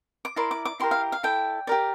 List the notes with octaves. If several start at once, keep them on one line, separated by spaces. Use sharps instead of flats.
D6
E4 A#4 D5 C6
D6
D6
E4 G4 A#4 C6
F5
F5
E4 A4 D5 G5
G4 A#4 D5